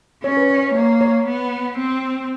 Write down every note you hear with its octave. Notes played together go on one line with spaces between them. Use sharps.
C#4 C#5
B4
C#5
C#5
A#3 C#5
C#5
B3
C4